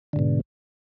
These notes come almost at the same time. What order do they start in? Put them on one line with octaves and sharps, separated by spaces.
D3 G#2 B2